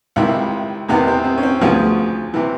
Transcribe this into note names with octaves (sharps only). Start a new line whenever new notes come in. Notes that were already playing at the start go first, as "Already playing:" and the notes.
C#2 C3 D#3 E4
E2 C3 D#3 B3
C4
C4
C#4
C4
D2 C#3 F3 B3
C3 E3